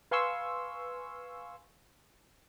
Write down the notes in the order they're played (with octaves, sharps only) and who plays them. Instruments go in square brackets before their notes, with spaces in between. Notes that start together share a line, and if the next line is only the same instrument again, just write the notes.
[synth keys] B4 F5 G#5 C6 C#6 E6